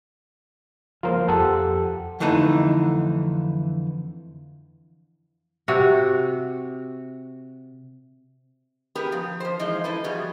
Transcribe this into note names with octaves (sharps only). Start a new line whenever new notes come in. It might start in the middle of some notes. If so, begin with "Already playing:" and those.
F3 F#3 A#3 F4 A#4 C5
F2 G4 A4 F#5
F2 D3 E3 A3 D#4
C3 F#4
B3 G4 G#4 A#4 B4
F3
F3 C5
E3 F3 G#3 D#4
E4 A4 B4
F3 G3 B3 F#4 G#4